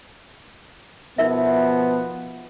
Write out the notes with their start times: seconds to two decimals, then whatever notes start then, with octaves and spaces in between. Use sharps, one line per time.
1.18 B2 F3 B3 D#4 A#4 E5